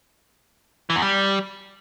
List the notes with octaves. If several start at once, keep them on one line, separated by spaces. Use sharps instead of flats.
E3
E2
G3